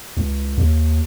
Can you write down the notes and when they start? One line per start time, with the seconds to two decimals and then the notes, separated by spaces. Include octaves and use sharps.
0.17 C#2
0.58 D#2